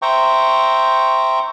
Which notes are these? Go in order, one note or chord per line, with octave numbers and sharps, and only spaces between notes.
C5 E5 G5 A#5 C#6